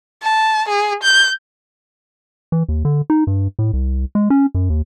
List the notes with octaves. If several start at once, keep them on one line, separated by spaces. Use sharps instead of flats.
A5
G#4
G6
E3
D#2
D3
D#4
G2
A2
C2
G#3
C#4
F#2
D#2